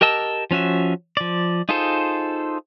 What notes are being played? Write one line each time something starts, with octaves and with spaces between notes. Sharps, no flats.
G4 A#4 D#5 A5 E6
F3 C#4 F#4 E5
F3 D5
D#4 F4 G#4 A4 C5